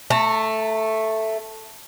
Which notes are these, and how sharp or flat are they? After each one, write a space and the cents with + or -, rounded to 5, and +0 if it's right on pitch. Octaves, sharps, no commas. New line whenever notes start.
A3 +0 A#5 -40